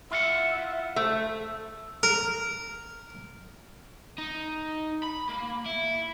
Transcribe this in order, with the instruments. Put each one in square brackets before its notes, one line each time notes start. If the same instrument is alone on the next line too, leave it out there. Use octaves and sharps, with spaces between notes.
[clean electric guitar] E4 F4 F#5 [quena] E5
[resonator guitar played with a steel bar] A3 [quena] C5
[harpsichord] A#4
[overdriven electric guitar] D#4
B5
A#3
E4